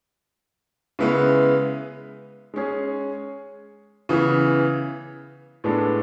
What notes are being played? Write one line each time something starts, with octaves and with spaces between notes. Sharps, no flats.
C#3 G#3 B3 E4 B4
G#3 C#4 G#4 C#5
C#3 E3 B3
A2 G#3 B3 D4 A4